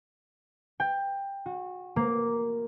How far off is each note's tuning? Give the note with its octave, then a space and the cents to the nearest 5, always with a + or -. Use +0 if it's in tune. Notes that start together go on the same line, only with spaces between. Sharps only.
G5 +15
F#4 -25
A#3 +0